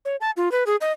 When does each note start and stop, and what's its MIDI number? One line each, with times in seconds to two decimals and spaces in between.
0.05 0.16 73
0.21 0.31 81
0.37 0.51 65
0.52 0.64 71
0.67 0.76 68
0.81 0.92 75